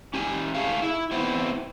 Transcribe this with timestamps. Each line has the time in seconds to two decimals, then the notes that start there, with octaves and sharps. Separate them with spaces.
0.14 C#4 G4 G#5
0.55 A3 G#4 F5
0.82 E4
1.11 B3 C4 E4